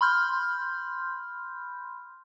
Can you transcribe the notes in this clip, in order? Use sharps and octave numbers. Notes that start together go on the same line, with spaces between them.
B5 C6 F6 G6